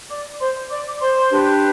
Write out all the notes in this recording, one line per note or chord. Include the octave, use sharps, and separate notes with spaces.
D5 D6
C5 C6
D5 D6
D6
C5 C6
D4 G4 B4